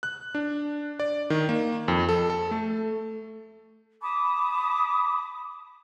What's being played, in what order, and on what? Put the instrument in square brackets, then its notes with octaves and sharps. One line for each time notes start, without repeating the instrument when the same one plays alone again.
[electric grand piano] F#6
D4
D5
D#3
A#3
F2
A4
A4
A3
[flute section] A5 B5 D6 D#6